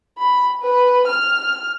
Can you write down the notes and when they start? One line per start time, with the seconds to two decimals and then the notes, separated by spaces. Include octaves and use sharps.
0.18 B5
0.62 B4
1.07 F6